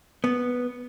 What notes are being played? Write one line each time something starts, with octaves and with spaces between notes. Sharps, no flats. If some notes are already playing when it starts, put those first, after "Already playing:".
B3